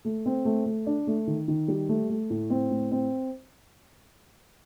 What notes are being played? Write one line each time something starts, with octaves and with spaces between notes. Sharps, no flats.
A3
C4
A3
A3
D4
A3
D#3
D#3
G3
A3
A3
A2
C4
A2
C4